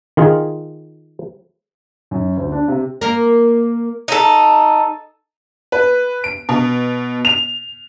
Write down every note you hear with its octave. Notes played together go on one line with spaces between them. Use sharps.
D#3 F4 G#4
F#2
D2
D4
C3
A#3 A#4
D#4 A4
B4
D7
B2
F7